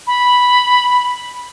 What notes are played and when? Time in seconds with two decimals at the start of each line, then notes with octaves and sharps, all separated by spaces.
0.07 B5